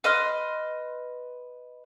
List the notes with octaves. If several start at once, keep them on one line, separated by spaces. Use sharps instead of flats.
B4 D#5 C6 F6